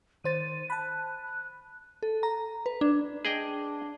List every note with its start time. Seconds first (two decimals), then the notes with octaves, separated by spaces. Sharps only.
0.24 D#3 C5 A6 D#7
0.70 A5 B5 F#6
1.24 F#6
2.03 A4
2.23 A#5
2.66 B4
2.81 D4
3.25 D4 G#4 D#5 G5